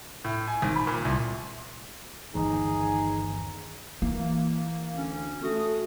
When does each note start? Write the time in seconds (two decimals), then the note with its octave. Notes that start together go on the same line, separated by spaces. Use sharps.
0.24 A2
0.47 G#5
0.62 G#1
0.76 B5
0.87 A#2
1.05 C2
2.35 G1 D#2 E3 D#4 G#4
4.02 E3 A#3
4.94 D2 C#4
5.43 A3 F#4 D#6